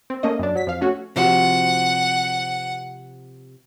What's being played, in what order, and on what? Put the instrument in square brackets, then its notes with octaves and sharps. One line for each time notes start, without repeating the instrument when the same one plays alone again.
[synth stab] C4
A3 A#3 C#4 D#5
F#2 D4
F#3 B6
F2 F5
A3 C#4 F#4
[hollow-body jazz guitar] C3 F3 F#4 [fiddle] F#5